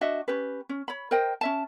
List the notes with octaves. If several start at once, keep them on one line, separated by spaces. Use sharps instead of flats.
D4 F#4 D#5 E5
C#4 G4 B4
C#4
C#5 B5
A#4 C5 D#5 G5
C#4 E5 A5